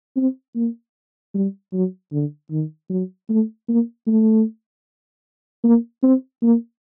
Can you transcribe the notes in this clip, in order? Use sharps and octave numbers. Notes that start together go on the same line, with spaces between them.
C4
A#3
G3
F#3
D3
D#3
F#3
A3
A#3
A3
A#3
C4
A#3